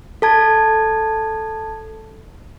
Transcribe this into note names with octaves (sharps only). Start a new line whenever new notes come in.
A4 A5 G#6